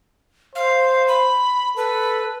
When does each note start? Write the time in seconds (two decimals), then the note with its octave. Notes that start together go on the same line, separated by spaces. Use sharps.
0.55 C5 F5
1.08 B5
1.77 A4 B4